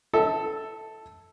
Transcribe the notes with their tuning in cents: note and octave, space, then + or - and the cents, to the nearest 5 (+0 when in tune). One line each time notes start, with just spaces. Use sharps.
A4 +0 E5 -35